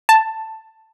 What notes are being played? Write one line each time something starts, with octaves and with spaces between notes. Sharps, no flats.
A5